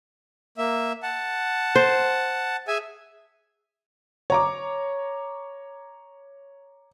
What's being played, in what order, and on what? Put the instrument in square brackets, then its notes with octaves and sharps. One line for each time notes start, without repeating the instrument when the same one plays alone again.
[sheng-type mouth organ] A#3 E5
F#5 A5
[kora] C5
[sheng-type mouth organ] G#4 E5 G#5
[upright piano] C#5 A#5 D6